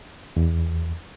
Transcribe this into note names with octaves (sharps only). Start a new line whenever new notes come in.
E2